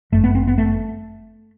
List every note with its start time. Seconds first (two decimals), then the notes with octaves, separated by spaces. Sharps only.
0.12 G1 F#2 A3
0.24 B3
0.35 C4
0.47 B3
0.58 A3